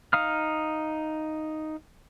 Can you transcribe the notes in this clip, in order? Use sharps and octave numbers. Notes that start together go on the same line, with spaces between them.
D#4 F5 D#6 F6